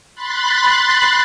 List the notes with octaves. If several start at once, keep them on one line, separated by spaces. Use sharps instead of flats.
B5 C6 F#6 A6